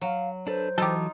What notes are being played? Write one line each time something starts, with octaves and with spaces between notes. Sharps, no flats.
F#3 F5
D4 A4 B4 C5
E3 F#3 D#4 F4 G4 A4